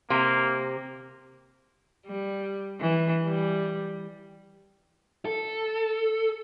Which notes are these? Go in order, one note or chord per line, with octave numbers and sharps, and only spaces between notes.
C3 A#3
G3
E3
G3
A4